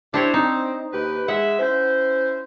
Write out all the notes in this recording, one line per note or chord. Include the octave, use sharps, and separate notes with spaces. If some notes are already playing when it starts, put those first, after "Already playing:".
D4 E4 G4 C5 C#5
C4 D#4
D#2 G4 B4
G#3 E5 F#5
C#4 E4 C5